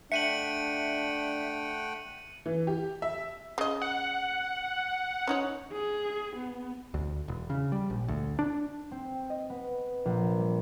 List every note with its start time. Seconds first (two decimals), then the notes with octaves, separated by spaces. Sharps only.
0.12 A3 D4 E5 F#5 G5 C#7 D#7 F#7
2.46 E3
2.67 G4
3.02 E5
3.58 C#3 D#5
3.82 F#5
5.27 C#4 D#4 C#5
5.72 G#4
6.36 B3
6.94 D2
7.28 E1
7.50 C#3
7.72 G3
7.90 A#1
8.08 D2
8.39 D4
8.91 C4
9.30 D#5
9.50 B3
10.05 A#1
10.39 G3